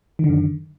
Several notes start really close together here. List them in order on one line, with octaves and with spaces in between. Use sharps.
D#3 D3 F#2